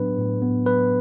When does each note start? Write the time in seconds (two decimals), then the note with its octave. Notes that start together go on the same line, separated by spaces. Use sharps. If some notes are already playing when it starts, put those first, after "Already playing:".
Already playing: A2 F#3 B3 D4 B4
0.18 A2
0.42 B3
0.66 F#3 B4